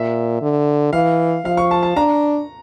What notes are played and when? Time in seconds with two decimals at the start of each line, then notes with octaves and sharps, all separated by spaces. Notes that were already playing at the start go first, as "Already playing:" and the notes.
Already playing: A#2 E5
0.42 D3
0.93 E3 F5
1.45 F3 F5
1.57 C#6
1.71 A5
1.83 A5
1.96 D4 A#5